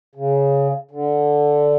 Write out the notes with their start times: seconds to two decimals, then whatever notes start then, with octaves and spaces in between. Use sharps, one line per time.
0.15 C#3
0.91 D3